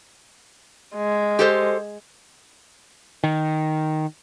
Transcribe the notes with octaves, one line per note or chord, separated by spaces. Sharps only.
G#3
G4 A4 C5
D#3